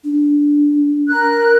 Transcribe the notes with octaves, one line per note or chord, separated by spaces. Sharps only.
D4
A#4 F#6